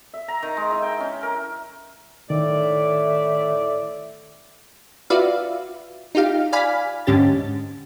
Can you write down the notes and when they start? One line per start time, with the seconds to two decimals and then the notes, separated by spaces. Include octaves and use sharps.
0.14 E5
0.28 A#5
0.42 D#3
0.57 G#3
0.71 E4
0.82 G5
1.00 C#4
1.23 A#4
2.30 A2 D#3 D5 E5
5.10 F4 F#4 B4 D5 E5 F5
6.15 D#4 F4 G4 F5
6.52 D5 F5 G#5 B5 F6 B6
7.07 G#2 D3 C#4 G4 A6